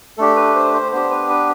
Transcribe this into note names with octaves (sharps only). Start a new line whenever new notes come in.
A3 D4 G4 A4
B4
C5
C5
B3 D4 G4 C5
B4
B4